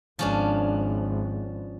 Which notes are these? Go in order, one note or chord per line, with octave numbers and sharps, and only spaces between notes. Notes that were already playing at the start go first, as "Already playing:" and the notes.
G#1 F3 C#4 D4